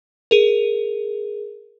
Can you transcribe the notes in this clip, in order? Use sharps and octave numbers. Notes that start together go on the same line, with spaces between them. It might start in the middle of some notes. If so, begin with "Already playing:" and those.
G#4 A#4